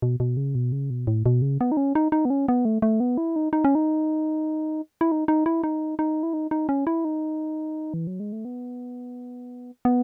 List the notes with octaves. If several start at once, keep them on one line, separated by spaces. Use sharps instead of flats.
B2
B2
C#3
B2
C#3
B2
A2
B2
C#3
B3
D#4
C#4
D#4
D#4
B3
C#4
B3
A3
A3
B3
E4
D#4
D#4
C#4
D#4
E4
D#4
D#4
E4
D#4
D#4
E4
D#4
D#4
C#4
E4
D#4
E3
F#3
G#3
A3
B3
B3